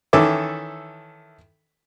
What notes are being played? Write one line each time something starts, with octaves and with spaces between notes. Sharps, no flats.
D#3 E3 C#4 A4 E5 D6